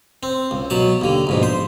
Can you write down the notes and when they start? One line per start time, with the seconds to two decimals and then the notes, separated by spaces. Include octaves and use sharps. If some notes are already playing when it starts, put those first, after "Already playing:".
0.23 C4
0.51 C#2
0.70 B2 F#3 A5
1.01 D#2 D3
1.27 A#1 G#2 B2
1.43 C5